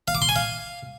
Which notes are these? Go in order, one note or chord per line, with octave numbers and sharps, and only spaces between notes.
F5
D6
C6
G#5
F5